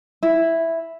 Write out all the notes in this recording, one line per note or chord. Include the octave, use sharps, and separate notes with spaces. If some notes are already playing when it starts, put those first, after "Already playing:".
E4